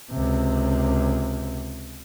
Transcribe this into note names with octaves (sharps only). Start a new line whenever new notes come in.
C#2 C3